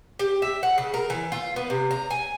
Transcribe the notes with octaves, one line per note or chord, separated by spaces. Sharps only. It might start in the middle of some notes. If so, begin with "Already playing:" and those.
G4
E5
F#5
C#3
A#4
E3
F4
B3
C3
A#5
G#5